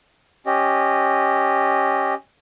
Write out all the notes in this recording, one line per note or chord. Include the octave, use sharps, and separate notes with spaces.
C#4 G4 D#5